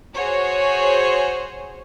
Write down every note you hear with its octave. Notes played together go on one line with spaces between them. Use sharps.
F#4 G#4 C5 C#5